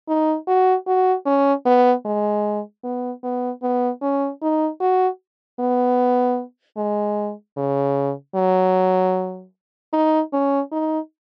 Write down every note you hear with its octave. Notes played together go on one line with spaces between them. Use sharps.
D#4
F#4
F#4
C#4
B3
G#3
B3
B3
B3
C#4
D#4
F#4
B3
G#3
C#3
F#3
D#4
C#4
D#4